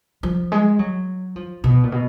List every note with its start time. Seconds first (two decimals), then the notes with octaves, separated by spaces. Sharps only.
0.23 F3
0.52 G#3
0.79 F#3
1.36 F3
1.64 B2
1.83 A#2
1.92 B2